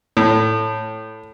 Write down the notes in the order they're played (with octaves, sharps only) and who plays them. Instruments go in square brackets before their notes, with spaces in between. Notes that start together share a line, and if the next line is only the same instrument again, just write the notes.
[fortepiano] A2